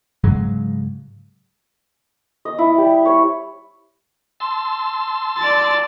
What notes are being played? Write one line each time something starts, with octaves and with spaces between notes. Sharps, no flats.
G#2 C#3 F#3 G#3
D#5
E4
G3
C#5
A5 C6 E6
D5 A6